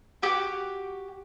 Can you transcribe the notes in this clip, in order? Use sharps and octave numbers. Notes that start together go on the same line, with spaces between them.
F#4 G4 D6